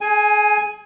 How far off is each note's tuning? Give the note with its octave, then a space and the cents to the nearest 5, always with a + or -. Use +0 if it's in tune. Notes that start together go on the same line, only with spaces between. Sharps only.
G#4 +30 G#5 +0